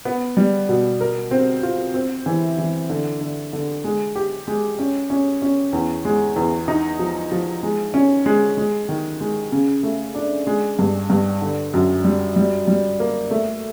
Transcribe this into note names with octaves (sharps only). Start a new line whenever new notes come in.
B3
G3
B2
A#4
C4
F4
C4
E3
E3
D3
D3
D3
G#3
G4
G#3
C#4
C#4
C#4
E2
G#3
E2
D#4
F3
F3
G#3
C#4
G#3
G#3
D#3
G#3
C#3
A3
D4
G#3
G2
G2
D3
F#2
G3
G3
G3
A#3
A3